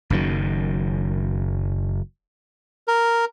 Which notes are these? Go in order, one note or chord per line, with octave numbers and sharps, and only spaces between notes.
F#1 F#2 D#3 F#3
A#4